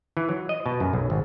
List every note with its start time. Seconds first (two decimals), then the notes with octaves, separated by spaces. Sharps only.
0.17 E3
0.29 F#3
0.49 D#5
0.66 B2
0.80 F#2
0.93 B1
1.10 G#1